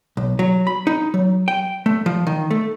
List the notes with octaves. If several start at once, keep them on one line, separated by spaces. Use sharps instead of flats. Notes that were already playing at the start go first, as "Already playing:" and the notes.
B1
F#3
B5
D#4
F#3
G5
A3
F3
D#3
A3